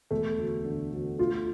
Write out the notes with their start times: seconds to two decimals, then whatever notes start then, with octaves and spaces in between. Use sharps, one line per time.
0.11 E1 A3 A4
0.38 D2
0.65 D3
0.92 D2
1.18 A3 F4